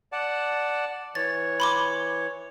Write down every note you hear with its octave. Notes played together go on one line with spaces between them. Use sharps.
D5 F#5 A5
E3 C#5 A6
B5 C6 D6